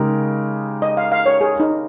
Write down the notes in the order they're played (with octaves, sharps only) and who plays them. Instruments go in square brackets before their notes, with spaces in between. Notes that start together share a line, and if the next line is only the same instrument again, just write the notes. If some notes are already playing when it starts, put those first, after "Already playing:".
Already playing: [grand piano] C#3 G#3 D#4 G4 A#4
[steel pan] D#5
F5
F5
C#5
G#4
D#4